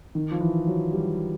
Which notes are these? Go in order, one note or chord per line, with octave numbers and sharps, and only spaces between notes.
D#3
F3
E3
F#3
G3